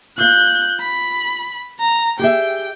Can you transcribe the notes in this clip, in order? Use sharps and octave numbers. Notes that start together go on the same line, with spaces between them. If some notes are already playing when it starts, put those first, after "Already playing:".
F4 F5 F#6 G6
B5
A#5
G4 G#4 E5 G5